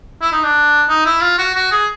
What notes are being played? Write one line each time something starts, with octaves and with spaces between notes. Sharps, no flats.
E4
D#4
D4
D#4
E4
F4
F#4
F#4
G#4